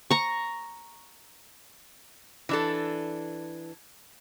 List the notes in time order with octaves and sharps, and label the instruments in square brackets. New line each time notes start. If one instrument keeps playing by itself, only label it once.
[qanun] A#5 C#6
[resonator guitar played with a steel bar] E3 D4 A4